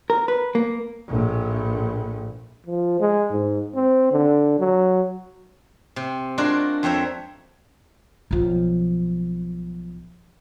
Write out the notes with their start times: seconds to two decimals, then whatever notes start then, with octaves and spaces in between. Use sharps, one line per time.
0.10 A#4
0.28 B4
0.55 A#3
1.07 A#1 A2
2.66 F3
3.00 G#3
3.32 G#2
3.75 C4
4.12 D3
4.59 F#3
5.96 C3
6.38 G#3 D4 F4 F#4 A#4
6.83 F2 C4 C5 C#5 E5 A#5
8.31 B1 F3